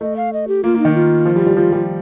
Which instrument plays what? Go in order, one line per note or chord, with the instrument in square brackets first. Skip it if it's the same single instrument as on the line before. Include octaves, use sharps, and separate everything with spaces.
[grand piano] A3 [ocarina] D#5
[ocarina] F5
D#5
G4
[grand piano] A#3 [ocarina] F4
[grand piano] A#3 [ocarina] D#4
[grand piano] D#3
[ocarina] F4
[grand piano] F3
G3
G3
[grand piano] F3 [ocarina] F4
[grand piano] G3